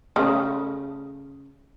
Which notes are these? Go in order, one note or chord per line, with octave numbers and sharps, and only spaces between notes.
C#3 A3